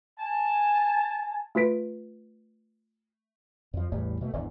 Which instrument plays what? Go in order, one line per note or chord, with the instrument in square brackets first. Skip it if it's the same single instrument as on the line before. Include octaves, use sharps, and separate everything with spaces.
[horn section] G#5 A5
[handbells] A3 F4 B4 B6 D7
[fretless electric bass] F2 F3
A1 E2 A2 G3
B2 A3
G#1 E2 D3